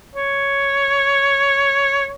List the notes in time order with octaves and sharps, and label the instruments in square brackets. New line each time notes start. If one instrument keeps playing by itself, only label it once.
[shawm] C#5